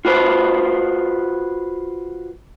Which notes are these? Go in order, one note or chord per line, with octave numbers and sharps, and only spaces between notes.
F4 F#4 B4 C5